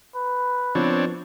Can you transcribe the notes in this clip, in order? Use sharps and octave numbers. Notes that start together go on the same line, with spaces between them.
B4
F3 B3 C4 D4 C#5